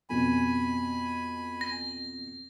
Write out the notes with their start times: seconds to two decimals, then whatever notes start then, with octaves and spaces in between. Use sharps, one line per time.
0.10 F2 B2 G#5 B5
1.61 A#6